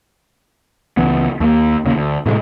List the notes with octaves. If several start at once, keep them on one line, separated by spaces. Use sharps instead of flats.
C#2 F#2 E3 B3
D#2 A3 A#3
D#2 C#3 A#3
D2
A2 C3 F3 G#3